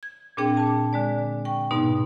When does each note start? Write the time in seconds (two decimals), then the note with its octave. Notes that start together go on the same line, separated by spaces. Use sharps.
0.03 G#6
0.37 A#2 C4 D4 G#4 G5
0.57 A5 D6
0.93 D3 G#3 D5
1.45 G5 C#6
1.71 G#2 B2 B3 D#4